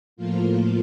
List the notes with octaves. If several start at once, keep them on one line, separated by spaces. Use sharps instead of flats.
A2 F3 A#3 F4